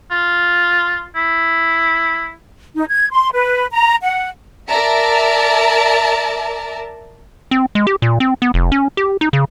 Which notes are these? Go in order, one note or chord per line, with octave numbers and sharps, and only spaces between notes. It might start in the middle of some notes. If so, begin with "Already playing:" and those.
F4
E4
D#4
G#6
C6
B4
A#5
F#5
A#4 D5 E5 A5 A#5
C4
G#3
G4
A#2
C4
B3
F1
C#4
G4
D#4
C#3